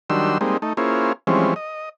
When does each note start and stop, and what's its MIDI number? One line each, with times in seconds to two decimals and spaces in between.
0.10 0.38 51
0.10 0.38 54
0.10 0.38 55
0.10 0.38 62
0.10 0.38 84
0.10 0.38 88
0.41 0.57 55
0.41 0.57 56
0.41 0.57 58
0.41 0.57 60
0.41 0.57 63
0.62 0.73 57
0.62 0.73 63
0.77 1.13 58
0.77 1.13 61
0.77 1.13 64
0.77 1.13 65
0.77 1.13 68
0.77 1.13 72
1.27 1.54 52
1.27 1.54 53
1.27 1.54 55
1.27 1.54 56
1.27 1.54 60
1.27 1.54 61
1.56 1.89 75